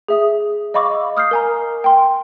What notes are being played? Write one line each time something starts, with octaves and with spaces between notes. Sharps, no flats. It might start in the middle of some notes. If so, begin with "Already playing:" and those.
G#4 E5 D#6
D#5 F5 B5 C#6 D6 E6
D#6 F6 G6 C7
A#4 G#5 A#5
G5 C6